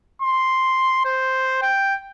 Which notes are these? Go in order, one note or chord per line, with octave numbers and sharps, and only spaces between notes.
C6
C5
G5